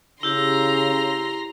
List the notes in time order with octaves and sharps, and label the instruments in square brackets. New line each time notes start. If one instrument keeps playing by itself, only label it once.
[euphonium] C#3 [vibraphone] E4 G4 [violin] A#5 C6